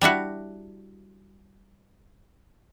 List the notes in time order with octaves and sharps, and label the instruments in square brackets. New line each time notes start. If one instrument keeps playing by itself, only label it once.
[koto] G3 D4 E4 F#4